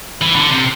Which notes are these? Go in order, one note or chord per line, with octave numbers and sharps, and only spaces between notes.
E3
D3
C3